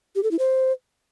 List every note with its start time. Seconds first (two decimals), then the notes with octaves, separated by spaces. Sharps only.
0.15 G4
0.23 A4
0.31 E4
0.39 C5